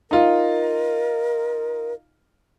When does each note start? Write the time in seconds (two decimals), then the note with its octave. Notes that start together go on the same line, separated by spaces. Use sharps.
0.11 D#4 F4 A#4